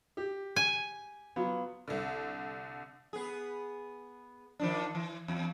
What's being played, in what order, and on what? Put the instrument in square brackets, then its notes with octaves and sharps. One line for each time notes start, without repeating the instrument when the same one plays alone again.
[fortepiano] G4
[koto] G#5
[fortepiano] F#3 B3 F4
[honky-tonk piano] C2 D3
[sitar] B3 G#4
D#3 F3 D4
E3
E2